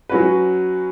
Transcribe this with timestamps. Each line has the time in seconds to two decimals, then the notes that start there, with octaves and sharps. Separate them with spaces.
0.09 F#3 C#4 F#4 B4